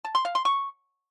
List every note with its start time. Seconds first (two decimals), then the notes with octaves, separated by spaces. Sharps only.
0.05 A5
0.15 C6
0.25 F5
0.35 C6
0.45 C#6